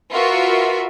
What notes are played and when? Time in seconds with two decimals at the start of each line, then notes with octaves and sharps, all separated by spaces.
0.13 F4 F#4 A#4 B4 E5